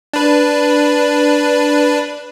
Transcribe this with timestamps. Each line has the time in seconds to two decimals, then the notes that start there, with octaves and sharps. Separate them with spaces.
0.13 D4 B4